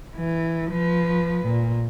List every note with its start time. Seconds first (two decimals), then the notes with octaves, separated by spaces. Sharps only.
0.15 E3
0.71 F3 B4
1.46 A#2